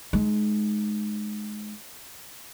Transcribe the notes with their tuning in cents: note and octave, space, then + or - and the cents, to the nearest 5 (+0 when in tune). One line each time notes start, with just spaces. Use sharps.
G#3 +25 D#4 -10